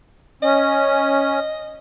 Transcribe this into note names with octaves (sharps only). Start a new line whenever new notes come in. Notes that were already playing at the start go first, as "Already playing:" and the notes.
C#4 D#5